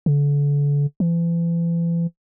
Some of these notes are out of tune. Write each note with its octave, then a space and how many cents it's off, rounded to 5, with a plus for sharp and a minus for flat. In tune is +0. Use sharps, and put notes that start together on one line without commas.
D3 -35
E3 +40